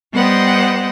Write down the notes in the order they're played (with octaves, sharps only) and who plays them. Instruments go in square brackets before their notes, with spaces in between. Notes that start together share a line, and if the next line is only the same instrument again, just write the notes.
[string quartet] G3 B3 C5 D#5 F#5 G5